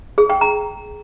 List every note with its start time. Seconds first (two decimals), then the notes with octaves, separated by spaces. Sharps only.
0.18 G#4
0.30 G5
0.41 A#5